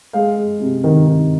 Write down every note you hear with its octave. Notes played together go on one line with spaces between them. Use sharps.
G#3 F5
G#3
C3
D#3
D#3